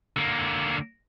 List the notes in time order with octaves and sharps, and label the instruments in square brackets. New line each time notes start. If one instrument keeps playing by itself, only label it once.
[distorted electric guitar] D3 A#3